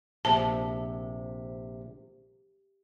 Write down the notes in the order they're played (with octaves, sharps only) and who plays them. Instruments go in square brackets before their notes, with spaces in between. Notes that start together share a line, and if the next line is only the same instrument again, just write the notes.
[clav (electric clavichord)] A#1 [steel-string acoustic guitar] C3 [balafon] A5